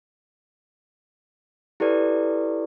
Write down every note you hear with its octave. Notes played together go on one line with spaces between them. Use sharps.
E4 G4 A4 B4 D5